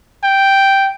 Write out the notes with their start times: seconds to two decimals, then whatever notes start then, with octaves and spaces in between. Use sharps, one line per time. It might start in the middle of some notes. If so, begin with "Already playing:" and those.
0.24 G5